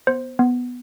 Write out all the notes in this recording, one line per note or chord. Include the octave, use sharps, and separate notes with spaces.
B3 C5
B3